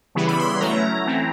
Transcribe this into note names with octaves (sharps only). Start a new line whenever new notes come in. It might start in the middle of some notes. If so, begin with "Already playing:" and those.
C#3 E3 G3 B3 E4
B5
C6
B5
F#3 A3 C#4 E4 A#5
E3 A3 C4 E4